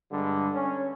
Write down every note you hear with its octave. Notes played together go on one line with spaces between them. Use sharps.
G2 D3 G3 G#3
C#4